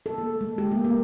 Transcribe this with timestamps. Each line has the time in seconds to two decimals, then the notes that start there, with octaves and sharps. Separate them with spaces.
0.06 A4
0.18 A#3
0.41 G#3
0.58 G4
0.71 A#3
0.85 A#3